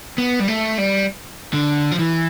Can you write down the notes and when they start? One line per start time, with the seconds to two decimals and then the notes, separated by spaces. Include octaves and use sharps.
0.18 B3
0.40 G3
0.48 A3
0.78 G3
1.53 D3
1.91 F3
1.99 E3